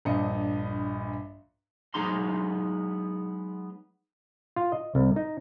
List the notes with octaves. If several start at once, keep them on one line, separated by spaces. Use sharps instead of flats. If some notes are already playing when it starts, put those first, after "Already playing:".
A#1 G2 D#5 C#7
F#3 G#3 B3 D#4 A#5 C6
F4
D#5
C2
D#4